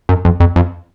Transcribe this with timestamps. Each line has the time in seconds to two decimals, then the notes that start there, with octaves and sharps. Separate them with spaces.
0.09 F#2
0.25 F2
0.40 F2
0.56 F2